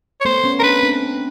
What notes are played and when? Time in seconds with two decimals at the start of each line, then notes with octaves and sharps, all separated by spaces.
0.21 C#5
0.25 A3 B3 C5
0.43 B3 C#4
0.59 A#4
0.63 C4 D4 B4
0.83 C4 D4